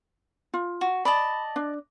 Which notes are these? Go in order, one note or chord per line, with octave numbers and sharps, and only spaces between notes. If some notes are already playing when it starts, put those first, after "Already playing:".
F4
F#4
D5 D#5 A5 B5
D4